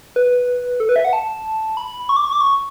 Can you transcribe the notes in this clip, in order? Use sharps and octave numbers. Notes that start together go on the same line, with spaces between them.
B4
A4
B4
E5
F#5
A5
B5
C#6
D6
C#6
D6
C#6